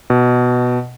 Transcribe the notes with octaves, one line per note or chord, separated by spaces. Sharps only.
B2